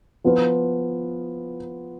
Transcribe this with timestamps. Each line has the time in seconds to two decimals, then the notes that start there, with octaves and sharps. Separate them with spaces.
0.24 F3 B3 F4 B4